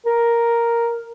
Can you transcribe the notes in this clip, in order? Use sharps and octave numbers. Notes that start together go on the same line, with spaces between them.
A#4